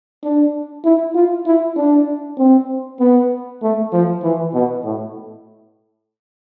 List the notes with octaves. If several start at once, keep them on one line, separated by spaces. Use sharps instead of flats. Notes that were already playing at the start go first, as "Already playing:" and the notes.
D4
E4
F4
E4
D4
C4
B3
A3
F3
E3
B2
A2